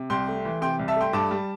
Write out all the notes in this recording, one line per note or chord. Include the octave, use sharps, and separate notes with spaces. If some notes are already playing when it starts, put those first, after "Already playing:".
Already playing: C3
C2 G5 C6
A3
E3
C3 G5 C6
C2
E5 A5
A3 G5 C6
G2 A5 D6
G3